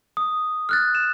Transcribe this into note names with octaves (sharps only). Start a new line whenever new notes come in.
D#6
F6 F#6 A6
E7